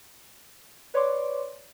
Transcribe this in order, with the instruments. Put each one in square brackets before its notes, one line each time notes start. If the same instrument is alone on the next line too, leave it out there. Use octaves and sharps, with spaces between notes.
[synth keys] B4 C#5 D5 C6 D6